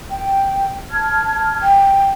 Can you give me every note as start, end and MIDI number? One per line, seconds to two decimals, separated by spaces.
0.12 0.79 79
0.91 1.65 81
0.91 1.65 89
0.91 1.65 92
1.62 2.11 79